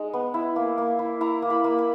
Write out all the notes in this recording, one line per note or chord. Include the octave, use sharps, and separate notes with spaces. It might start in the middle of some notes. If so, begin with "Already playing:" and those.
Already playing: G#3 D#4
B3
E4
A#3
A#3
E4
E4 A#5
A#3
B5
A#3
B5